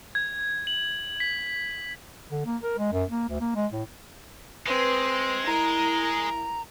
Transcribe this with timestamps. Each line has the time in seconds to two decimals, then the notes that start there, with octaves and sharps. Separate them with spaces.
0.15 G#6
0.67 F#7
1.20 B6
2.31 D3
2.46 A#3
2.63 A#4
2.78 G#3
2.92 F#2
3.10 A#3
3.29 D2
3.41 A#3
3.56 G#3
3.72 A2
4.67 G#3 C4 B4
5.47 E4 A#4 A#5